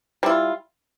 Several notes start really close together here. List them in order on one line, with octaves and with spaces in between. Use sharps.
G3 E4 F4